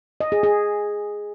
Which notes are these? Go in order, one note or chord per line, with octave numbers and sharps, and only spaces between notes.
D#5
G#4
G#4